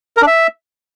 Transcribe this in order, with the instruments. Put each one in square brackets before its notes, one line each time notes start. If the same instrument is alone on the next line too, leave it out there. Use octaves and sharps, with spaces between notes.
[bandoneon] A#4
D4
E5